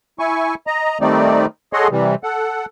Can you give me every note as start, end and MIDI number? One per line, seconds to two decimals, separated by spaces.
0.19 0.55 64
0.19 0.55 80
0.19 0.55 85
0.67 0.98 75
0.67 0.98 82
1.01 1.46 51
1.01 1.46 55
1.01 1.46 57
1.01 1.46 60
1.01 1.46 63
1.01 1.46 74
1.73 1.88 68
1.73 1.88 69
1.73 1.88 73
1.73 1.88 75
1.73 1.88 78
1.73 1.88 84
1.91 2.15 48
1.91 2.15 52
1.91 2.15 55
2.23 2.66 69
2.23 2.66 78